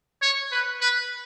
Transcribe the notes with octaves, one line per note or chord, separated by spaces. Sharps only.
C#5
B4
B4